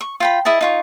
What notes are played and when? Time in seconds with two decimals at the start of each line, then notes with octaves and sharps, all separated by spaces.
0.01 C#6
0.20 F4 G5 B5
0.45 E4 G#4 D#5 A5
0.61 D#4 F4 C#6